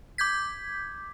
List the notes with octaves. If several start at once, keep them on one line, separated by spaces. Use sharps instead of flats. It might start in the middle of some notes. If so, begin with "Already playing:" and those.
D6 G6 G#6 B6